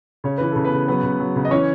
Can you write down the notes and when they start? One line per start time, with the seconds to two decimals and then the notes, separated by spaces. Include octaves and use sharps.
0.24 C#3 C#5
0.38 E3 B4
0.51 C#3 A4
0.65 B3 B4
0.73 C#3
0.87 F#3 B3 B4
1.03 C#3
1.20 F#3
1.36 C#3
1.45 D#5
1.51 E3 C#4 C#5